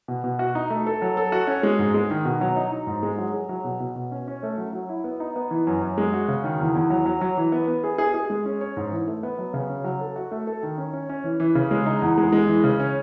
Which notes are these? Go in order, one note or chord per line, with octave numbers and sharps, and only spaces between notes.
B2
B2
F#4
D#4
A3
A4
F#3
A4
F#4
C#4
G#3
G#2
G#3
D#3
B2
F#3
D#4
D#4
G#2
G#3
F#3
G#4
F#3
B2
B2
B2
C#4
C#4
A3
F#3
F#3
E4
B3
D#4
B3
E3
F#2
F#2
G#3
F#4
C#3
D#3
E2
E2
F#3
F#3
F#3
E3
B3
B3
G#4
G#4
G#4
G#3
C#4
C#5
G#2
E3
A3
B3
F#3
C#3
C#4
F#3
A4
F#4
A3
A4
D#3
C#4
C#4
C#4
E3
E3
C#3
G#3
D#4
E2
G#3
G#3
E3
C#3
C#4